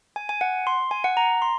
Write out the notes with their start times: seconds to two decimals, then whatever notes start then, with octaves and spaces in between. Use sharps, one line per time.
0.16 G#5
0.29 G#5
0.41 F#5
0.67 C6
0.91 G#5
1.04 F#5
1.17 A#5
1.42 C6